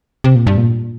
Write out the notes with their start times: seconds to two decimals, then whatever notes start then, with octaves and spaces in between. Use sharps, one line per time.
0.24 C3
0.35 A#2
0.47 G2
0.57 A#2